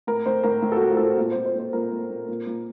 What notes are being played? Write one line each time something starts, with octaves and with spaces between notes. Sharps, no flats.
A2 A#4
A2 C5
A2 A#4
A2
A4
F#4
A2
F4
A2 A4
F#4
A#2 F4
A#2 C5
C5
A#2 C5
A#2 A#4
A#2
A#2
A#2
A#2